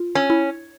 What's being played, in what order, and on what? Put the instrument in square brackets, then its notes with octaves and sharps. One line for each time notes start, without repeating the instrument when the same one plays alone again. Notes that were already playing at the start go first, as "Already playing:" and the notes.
Already playing: [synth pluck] F4
[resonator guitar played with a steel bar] C#4
[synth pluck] E4